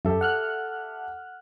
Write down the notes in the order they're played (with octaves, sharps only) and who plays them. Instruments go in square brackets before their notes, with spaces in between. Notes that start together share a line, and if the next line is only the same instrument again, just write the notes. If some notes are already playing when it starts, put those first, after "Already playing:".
[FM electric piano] F#2 [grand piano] G4 A4 E5
[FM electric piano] F#5 F6 F#6